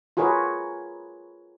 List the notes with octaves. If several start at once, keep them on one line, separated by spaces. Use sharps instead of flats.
F4 F#4 G#4 A#4 B4 C#5